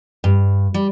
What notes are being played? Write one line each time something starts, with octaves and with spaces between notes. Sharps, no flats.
G2
G3